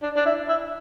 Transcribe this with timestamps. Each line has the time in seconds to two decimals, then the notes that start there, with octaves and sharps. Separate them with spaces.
0.02 D4
0.16 D4
0.26 E4
0.48 E4